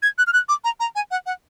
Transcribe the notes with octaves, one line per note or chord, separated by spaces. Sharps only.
G#6
F#6
F6
F#6
D6
A#5
A#5
G#5
F#5
F#5